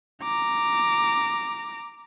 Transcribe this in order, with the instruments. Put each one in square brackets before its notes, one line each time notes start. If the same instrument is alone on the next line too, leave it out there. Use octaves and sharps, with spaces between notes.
[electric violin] A#5 D6